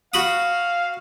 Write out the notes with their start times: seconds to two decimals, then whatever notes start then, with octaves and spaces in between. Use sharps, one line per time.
0.14 F#4 F5 B5 D#6